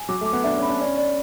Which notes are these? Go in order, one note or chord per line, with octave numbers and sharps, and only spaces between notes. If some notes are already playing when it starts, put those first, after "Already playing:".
Already playing: G#5
F#3 D6
A3
D6
B3
D4 E5
C#4
B5
D4
C#4 D5
D5